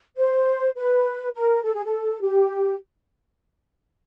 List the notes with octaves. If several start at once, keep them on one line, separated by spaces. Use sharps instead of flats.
C5
B4
A#4
A4
G#4
A4
G4